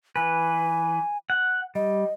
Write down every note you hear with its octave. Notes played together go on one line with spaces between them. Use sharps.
E3 B4 G#5
F#5
G3 D#5